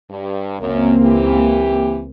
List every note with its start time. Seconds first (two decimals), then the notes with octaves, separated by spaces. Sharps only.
0.10 G2
0.60 C#2 F#2 A#3 C4
1.02 E3 G4